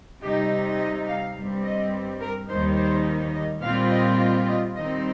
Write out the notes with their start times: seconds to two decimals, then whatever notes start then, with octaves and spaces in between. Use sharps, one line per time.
0.21 C3 G3 D#4 G4
0.79 D#5
1.07 F5
1.36 G2 G3 C4
1.64 D#5
2.20 A#4
2.49 D#2 D#3 G3 D#4 C5
2.77 C5
3.34 D#5
3.62 A#2 G3 C4 F4 F5
3.90 D#5
4.19 D#5
4.47 D#5
4.76 D#3 G3 C4 D#4 D#5